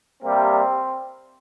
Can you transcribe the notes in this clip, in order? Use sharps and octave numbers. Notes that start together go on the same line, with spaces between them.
C3 G3 A#3 C4